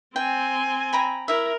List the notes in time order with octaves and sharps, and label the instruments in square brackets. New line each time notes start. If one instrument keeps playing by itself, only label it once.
[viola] C4 G#5 [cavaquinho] G5
[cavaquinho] G5 A#5 B5
[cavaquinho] E4 E5 [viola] A#4